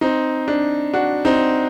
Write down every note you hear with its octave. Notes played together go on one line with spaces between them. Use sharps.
C4 D#4
D4
D4 F#4
C4 D#4